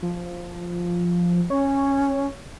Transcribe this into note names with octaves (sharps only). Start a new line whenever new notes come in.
F3
C#4 C#5